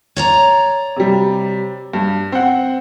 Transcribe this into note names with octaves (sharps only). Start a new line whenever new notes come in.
C#5 D5 A#5
C3 G3
G2
C4 F#5